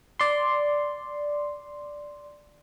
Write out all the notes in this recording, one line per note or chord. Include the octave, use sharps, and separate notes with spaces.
D5 C6